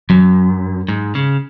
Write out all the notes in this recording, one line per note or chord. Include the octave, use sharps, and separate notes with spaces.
F#2 F#3
G#2
C#3